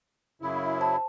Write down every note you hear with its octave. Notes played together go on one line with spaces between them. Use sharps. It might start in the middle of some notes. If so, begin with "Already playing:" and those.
F#2 C#3 E4
C5 A5